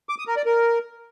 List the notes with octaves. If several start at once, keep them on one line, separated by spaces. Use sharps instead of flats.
D6
D#6
A#4
D5
A#4